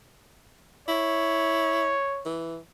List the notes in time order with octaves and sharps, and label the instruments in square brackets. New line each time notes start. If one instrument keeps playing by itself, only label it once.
[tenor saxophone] E4 [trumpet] C#5
[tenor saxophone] E3